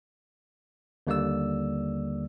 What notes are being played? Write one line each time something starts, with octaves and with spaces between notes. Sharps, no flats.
D#2 D3 G3 A#3 D5 E6